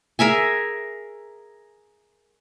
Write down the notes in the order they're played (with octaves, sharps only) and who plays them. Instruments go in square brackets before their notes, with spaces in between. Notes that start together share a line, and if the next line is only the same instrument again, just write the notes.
[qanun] G#4 A#4 E5 G#5